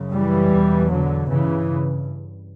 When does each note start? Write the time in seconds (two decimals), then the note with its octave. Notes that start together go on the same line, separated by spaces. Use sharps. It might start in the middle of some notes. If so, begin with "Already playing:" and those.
Already playing: F#2 C#3
0.12 E3 G3
0.53 E2 B2
0.91 D3 F#3
1.30 G2 C#3 E3